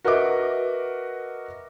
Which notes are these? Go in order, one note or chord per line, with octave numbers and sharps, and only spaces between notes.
F#4 A#4 B4 D#5 E5 D6